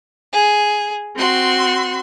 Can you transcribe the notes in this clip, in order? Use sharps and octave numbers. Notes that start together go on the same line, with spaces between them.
G#4
C4 F#4 C6